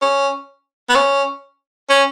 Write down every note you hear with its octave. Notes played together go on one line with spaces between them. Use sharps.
C#4
B3
C#4
C#4